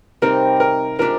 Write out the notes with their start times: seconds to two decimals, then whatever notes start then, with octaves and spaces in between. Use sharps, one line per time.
0.22 C3 G3 C4 D#4 A#4
0.60 A#4
0.99 F3 G#3 D4 G4 A#4